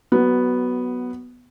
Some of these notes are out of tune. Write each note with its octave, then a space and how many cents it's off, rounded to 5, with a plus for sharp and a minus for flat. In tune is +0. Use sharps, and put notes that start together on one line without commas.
F#3 +15 B3 +0